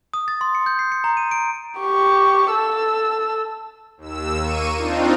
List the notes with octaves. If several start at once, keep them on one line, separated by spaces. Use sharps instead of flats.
D#6
A6
C6
C#7
G6
C7
C#7
A#5
D#7
D7
G4 C#6
A4 E6
D#2 E6
A#3 C#6 D#7
C4 D4 D#4 F4